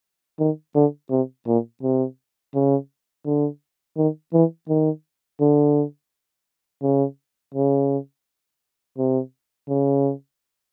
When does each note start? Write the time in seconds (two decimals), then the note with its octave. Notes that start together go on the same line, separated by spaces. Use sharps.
0.39 D#3
0.75 D3
1.10 C3
1.47 A#2
1.82 C3
2.54 C#3
3.25 D3
3.97 D#3
4.33 E3
4.68 D#3
5.40 D3
6.82 C#3
7.54 C#3
8.98 C3
9.68 C#3